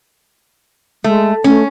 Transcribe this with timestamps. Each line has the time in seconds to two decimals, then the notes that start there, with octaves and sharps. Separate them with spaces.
1.04 G#3 A3
1.44 A3 C#4